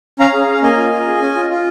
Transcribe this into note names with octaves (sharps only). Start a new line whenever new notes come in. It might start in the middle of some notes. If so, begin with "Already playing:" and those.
C#4 F5 A#5
G#4
C#4
A#3 D#5 G#5
F4
F4
G#4
C#4
F4
F4